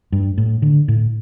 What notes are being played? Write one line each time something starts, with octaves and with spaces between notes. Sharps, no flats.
G2
A2
D3
A2